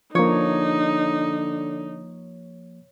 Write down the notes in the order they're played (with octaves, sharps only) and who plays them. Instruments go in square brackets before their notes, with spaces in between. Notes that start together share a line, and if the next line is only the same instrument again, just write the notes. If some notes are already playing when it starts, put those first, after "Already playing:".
[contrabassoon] D3 [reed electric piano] F3 A#3 [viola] D#4 [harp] C#5